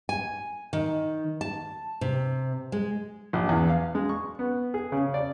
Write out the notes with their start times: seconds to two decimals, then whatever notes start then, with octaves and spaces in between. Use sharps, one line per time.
0.09 G#5
0.73 D#3
1.41 A5
2.01 C3
2.72 G#3
3.33 A#1
3.49 E2
3.69 F5
3.95 G#3
4.09 C#6
4.39 B3
4.74 G#4
4.92 C#3
5.14 D5